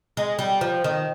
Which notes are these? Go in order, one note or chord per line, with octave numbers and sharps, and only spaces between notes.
G#3
G3
F3
D#3